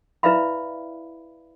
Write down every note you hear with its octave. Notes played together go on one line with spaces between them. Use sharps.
E4 B4 D5 E5 F5 B5